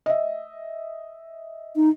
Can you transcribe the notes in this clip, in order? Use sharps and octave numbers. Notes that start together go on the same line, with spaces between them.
D#5 E5
D#4